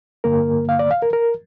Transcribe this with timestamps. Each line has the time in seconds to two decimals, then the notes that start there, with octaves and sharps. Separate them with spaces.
0.24 G2 D3 A#3 A#4
0.69 F5
0.79 D5
0.91 F5
1.02 A#4
1.13 A#4